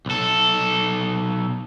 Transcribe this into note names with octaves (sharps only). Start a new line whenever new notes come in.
B1 A4